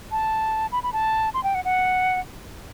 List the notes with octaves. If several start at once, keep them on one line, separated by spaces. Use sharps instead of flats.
A5
B5
B5
A5
C6
G5
F#5
F#5